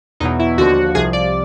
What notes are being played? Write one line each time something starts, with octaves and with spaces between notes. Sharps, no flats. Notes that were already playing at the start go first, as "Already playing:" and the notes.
E2 B2 F#3 D#4
E4
D#2 D3 F3 F#4
C2 C3 F3 G#4
D5